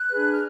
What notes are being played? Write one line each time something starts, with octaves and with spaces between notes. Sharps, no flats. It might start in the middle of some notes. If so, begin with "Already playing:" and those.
Already playing: F#6
D4 G#4 B4
F6